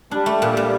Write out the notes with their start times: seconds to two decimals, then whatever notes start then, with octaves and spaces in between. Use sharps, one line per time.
0.11 G3 D4
0.26 A3
0.42 A#2
0.57 A#2